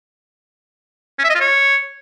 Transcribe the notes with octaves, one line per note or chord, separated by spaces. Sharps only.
C#4
E5
D#5
F4
C#5